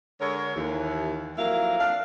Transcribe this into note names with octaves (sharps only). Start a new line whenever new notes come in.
D3 G#3 A#4 C#5
D#2 E3
F2 F#3 A#3 E4 A#4 F5
D4 F5